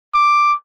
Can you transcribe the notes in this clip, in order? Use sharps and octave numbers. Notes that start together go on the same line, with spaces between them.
D6